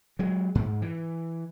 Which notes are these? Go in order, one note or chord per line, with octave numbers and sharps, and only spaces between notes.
F#3 G#3
G#2
E3